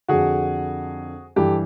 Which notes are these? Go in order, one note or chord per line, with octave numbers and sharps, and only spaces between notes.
F2 D3 F#4 G#4
G2 E3 G4 A4